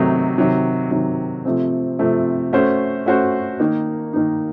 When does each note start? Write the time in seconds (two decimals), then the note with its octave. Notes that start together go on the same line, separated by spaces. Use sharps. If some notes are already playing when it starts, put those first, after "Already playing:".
Already playing: C3 D#3 F#3 A3 D#4
0.38 C3 D#3 F#3
0.91 C3 D#3 F#3
1.45 C3 F3 A3 C4
1.99 C3 F3 A3 C4
2.53 A3 C#4 F#4 C5
3.06 A3 C#4 F#4 C5
3.60 D#3 A#3 D#4
4.13 D#3 A#3 D#4